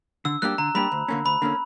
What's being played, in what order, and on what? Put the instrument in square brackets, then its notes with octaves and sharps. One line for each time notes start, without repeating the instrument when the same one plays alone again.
[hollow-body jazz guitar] D3 [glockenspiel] E6
[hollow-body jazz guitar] G3 A#3 D4 G4 [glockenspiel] F#6
[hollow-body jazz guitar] D3 [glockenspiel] A#5
[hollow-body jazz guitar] G3 A#3 D4 G4 [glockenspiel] B5
[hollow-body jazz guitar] D2
D3 A#3 C#4
[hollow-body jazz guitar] D2 [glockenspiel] B5
[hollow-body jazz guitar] D3 A#3 C#4